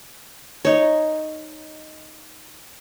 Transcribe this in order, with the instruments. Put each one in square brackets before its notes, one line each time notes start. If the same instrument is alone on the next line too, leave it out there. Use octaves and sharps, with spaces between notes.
[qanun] D#4 C#5